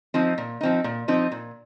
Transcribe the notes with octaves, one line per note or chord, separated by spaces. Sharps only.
F3 C4 D#4
A#2
F3 C4 D#4
A#2
F3 C4 D#4
A#2